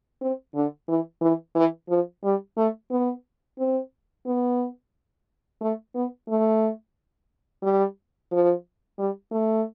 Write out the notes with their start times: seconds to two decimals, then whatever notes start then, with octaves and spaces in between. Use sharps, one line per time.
0.21 C4
0.55 D3
0.89 E3
1.22 E3
1.55 E3
1.89 F3
2.24 G3
2.57 A3
2.91 B3
3.59 C4
4.26 B3
5.61 A3
5.95 B3
6.29 A3
7.63 G3
8.31 F3
8.99 G3
9.31 A3